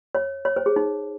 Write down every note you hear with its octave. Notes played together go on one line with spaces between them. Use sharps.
C#5
C#5
C5
G#4
D#4